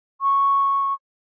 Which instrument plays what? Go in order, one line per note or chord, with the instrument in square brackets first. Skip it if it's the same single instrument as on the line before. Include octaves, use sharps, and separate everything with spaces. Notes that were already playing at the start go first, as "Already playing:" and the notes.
[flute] C#6